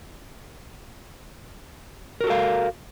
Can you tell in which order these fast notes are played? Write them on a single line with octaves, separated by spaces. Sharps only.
A#4 F#4 A4 F5